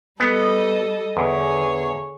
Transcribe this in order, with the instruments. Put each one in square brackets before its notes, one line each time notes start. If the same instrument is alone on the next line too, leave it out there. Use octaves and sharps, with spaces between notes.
[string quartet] G3 A4 D#5 [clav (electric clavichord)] B3
[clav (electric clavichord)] E2 [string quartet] D3 G#4 C#5